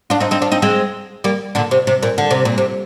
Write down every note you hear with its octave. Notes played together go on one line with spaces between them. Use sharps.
D4 F4
C4 D#4
C4 D#4
D4 F4
C4 D#4
G#3 C4
G3 A#3
A#2 D3
C3
C3
A#2
D3
C3
A#2
C3